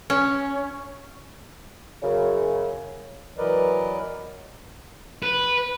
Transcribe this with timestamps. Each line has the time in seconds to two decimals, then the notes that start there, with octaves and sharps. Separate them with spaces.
0.10 C#4
2.03 F#2 C#3
3.38 E3 F#3 A#4 B4 D5 D#5
5.23 B4